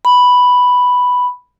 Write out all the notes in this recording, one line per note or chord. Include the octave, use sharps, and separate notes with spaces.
B5